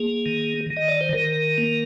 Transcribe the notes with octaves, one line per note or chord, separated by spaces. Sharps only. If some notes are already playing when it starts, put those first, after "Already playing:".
Already playing: A#3 G#4
D#3
D#3
D#5
D5
C5
D#3 A#4
A#3